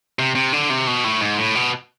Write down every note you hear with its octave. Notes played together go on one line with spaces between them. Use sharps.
C3
C3
D3
C3
B2
A2
G#2
A2
B2